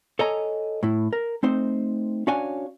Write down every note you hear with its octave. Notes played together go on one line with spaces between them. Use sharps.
A4 C#5 D#5 G#5 A#5
A2 E4
A#4
A3 C4 D#4 C5
C#4 D4 F#4 C#5 F5 G#5